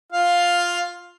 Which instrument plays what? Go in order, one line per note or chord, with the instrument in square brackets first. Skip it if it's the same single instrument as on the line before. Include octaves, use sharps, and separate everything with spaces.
[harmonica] F4 F5